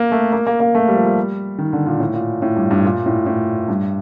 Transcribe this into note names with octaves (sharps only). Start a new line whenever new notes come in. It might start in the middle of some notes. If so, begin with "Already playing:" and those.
Already playing: A#3
A3
A#3
A#3
A#3
A3
G3
F3
G3
D#3
D3
A#2
A2
A#2
A2
G2
G2
A#2
A2
A2
G2